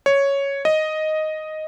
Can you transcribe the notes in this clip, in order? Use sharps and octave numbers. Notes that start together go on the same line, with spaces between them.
C#5
D#5